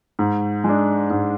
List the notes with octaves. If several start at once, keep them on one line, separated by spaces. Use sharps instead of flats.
G#2
G#3 D4
G#2